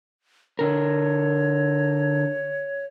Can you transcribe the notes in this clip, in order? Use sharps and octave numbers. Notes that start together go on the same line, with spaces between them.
D3 A#4 C#5